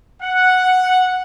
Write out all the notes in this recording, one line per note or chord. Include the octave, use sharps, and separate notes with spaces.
F#5